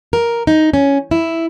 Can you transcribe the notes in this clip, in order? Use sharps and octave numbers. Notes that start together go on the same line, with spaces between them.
A#4
D#4
C#4
E4